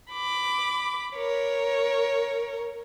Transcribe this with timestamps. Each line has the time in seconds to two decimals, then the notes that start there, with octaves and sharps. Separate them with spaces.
0.11 B5 D6
1.16 A#4 C#5